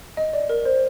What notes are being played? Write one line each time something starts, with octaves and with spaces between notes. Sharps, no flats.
D#5
D5
A#4
C5